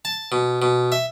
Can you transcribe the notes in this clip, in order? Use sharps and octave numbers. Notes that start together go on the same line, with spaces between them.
A5
B2
B2
E5